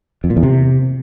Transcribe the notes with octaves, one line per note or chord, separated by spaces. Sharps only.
F2
A#2
E2
C3